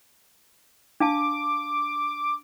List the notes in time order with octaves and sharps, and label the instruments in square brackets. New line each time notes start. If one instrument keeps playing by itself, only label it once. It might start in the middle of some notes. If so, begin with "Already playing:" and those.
[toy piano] D4 F5 A5 [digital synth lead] D6